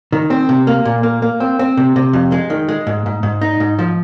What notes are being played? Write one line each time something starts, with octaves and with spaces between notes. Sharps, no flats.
D#3
C4
C3
A#3
A#2
A#3
A#3
C4
C4
C3
C3
F2
G#3
D#3
G#3
G#2
G#2
G#2
D#4
G#2
F3